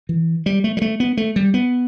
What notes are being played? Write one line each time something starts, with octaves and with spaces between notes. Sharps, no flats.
E3
G3
A3
G3
A3
B3
A3
G3
B3